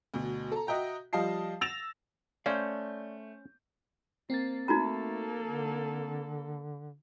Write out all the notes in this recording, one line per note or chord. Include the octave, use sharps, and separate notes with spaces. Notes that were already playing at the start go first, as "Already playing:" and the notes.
D2 B2
A4 A#5
F#4 D#5 E5 G5 A#5
F3 G3 D#5 F5 A5 C7
E6 A6 A#6 E7 F7
A3 C#4 C5 D5 F5 G6
A#3 C4 A6
A3 A#3 D#4 F#4 A4 A#5
D3